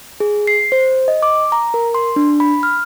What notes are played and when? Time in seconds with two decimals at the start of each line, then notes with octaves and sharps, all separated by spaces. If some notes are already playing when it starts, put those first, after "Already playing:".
0.20 G#4
0.47 C7
0.72 C5
1.08 D#5
1.23 D6
1.52 A#5
1.74 A#4
1.95 C6
2.16 D4
2.40 B5
2.63 F6